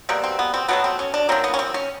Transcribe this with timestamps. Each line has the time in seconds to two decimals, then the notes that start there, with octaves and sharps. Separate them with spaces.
0.09 B2 G3 A#3 C4
0.24 C4
0.39 B3
0.54 C4
0.68 B2 F#3 A3 B3
0.84 C4
0.99 C#4
1.14 D4
1.29 D#3 F#3 A#3 C4
1.44 B3
1.54 C#4
1.59 C4
1.74 C#4